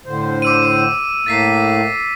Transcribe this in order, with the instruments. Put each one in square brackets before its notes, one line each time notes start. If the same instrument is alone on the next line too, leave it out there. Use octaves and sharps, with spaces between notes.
[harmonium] A2 D3 C5
[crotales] D6 E6 D#7
[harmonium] A2 A3 A#3 [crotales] A6 B6 C7